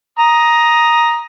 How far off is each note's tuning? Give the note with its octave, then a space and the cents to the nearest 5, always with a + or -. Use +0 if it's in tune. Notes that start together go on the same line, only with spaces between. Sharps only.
A#5 +10 D#6 +0